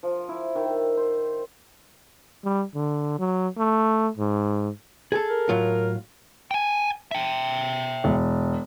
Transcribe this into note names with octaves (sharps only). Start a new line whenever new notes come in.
F3
E4
D#3
C5
G3
D3
F#3
A3
G#2
G#4 A4
A#4
A2 F#3 F4
G5 G#5
E5 G5
E1